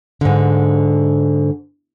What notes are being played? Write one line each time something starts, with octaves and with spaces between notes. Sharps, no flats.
G#2 D3